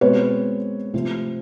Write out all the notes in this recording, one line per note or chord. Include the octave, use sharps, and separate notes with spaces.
B2 G#3 C4 B4 C#5
C3 F3 A3 C4